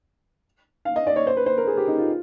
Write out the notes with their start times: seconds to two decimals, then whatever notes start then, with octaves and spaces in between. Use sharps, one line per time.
0.85 F5
0.96 D#5
1.07 D5
1.16 C#5
1.27 C5
1.37 B4
1.46 C5
1.58 A#4
1.67 G#4
1.77 G4
1.87 D#4
1.98 F4